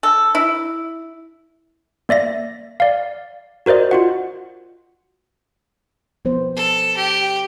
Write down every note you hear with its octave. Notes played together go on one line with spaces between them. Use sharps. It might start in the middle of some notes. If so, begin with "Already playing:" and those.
A4
E4
A#3 D5 E5 A#6
D5 F5
F#4 A#4 C5 D5 D#5
F4 F#4 F#5
F3 B3 C5
A4
G4